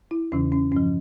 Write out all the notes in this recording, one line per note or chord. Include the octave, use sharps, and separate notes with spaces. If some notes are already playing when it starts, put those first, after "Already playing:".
E4
E2 C#3 E3 C#4
C#4
G2 F3 C#4